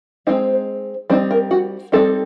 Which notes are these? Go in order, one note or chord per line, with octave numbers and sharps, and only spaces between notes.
G#3 C4 D#4 C5
G3 C4 D#4 C5
A#4
F#4
G3 C4 D#4 A4